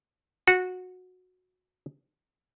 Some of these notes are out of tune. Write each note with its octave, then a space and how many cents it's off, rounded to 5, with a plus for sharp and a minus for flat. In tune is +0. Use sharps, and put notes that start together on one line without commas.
F#4 -15